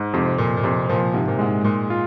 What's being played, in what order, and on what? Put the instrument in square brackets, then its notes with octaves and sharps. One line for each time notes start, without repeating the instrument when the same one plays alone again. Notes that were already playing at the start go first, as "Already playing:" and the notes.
Already playing: [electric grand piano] G#2
[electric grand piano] F2 [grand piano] C3
[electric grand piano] F2 [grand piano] A#2
[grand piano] A#2
[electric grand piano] F2 [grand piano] C3
[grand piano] A#2 [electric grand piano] F3
[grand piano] G#2 [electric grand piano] C3
[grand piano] A#2
[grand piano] G#2 [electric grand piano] G#3
[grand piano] A#2 [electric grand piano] G#3
[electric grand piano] F4